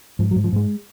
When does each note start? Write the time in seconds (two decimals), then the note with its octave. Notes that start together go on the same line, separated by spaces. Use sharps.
0.19 G#2 F3
0.31 F#3
0.36 G#2
0.44 F3
0.53 G#2 G#3